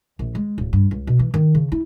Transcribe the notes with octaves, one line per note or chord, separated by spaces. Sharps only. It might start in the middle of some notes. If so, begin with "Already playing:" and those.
A#1
G#3
D1
G2
C#2
B2
E3
D#3
C#3
E4